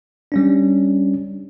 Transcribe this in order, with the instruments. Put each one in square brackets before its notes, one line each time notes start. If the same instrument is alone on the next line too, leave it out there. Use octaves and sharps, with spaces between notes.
[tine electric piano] G3 C#4 D4